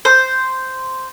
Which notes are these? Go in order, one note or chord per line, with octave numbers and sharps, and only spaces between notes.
C5